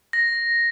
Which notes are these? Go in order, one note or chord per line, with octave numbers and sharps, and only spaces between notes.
A#6